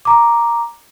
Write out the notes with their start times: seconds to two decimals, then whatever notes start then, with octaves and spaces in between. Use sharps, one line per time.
0.05 A#5 D6